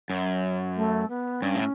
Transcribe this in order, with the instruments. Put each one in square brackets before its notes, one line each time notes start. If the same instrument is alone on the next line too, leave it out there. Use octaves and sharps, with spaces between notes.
[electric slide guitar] F#2
[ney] A3
B3
[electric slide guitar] G2 [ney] C#4
[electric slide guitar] A2